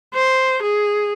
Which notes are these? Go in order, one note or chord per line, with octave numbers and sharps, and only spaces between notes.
C5
G#4